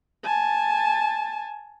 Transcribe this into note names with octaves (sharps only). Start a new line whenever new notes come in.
G#5 A5